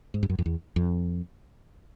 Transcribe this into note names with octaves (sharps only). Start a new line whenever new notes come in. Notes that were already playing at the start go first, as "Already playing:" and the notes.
G#2
G2
F#2
F2
E2
F2